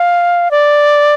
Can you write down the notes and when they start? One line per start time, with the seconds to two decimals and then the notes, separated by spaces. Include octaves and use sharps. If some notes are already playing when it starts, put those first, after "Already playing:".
Already playing: F5
0.51 D5